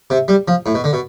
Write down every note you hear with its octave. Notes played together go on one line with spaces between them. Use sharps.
C3
G3
F3
A2
B2
D3
B2